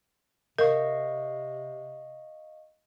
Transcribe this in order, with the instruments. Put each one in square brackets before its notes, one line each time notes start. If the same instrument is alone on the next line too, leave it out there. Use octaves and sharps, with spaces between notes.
[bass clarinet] C3 [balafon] A#4 [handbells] D#5 F5 C#6